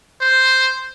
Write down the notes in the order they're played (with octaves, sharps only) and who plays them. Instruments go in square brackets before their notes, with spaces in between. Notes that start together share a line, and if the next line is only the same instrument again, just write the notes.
[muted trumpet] C5